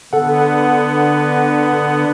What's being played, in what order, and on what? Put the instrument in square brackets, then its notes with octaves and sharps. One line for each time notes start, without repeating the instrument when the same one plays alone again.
[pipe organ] D3 B3 [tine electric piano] A4 F#5